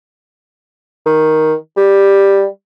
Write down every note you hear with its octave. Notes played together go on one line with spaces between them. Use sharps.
D#3
G3